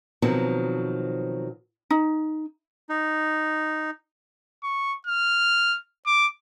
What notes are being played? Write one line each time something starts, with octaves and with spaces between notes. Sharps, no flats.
B2 D#3 F3 F#3 C4
D#4
D#4
C#6
F6
D6